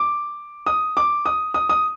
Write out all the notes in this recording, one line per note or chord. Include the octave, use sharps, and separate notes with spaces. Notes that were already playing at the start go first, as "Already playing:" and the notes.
Already playing: D6
D#6
D6
D#6
D#6
D#6